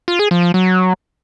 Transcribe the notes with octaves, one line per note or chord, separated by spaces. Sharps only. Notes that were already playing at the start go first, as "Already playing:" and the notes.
F4
G#4
F3
F3
F#3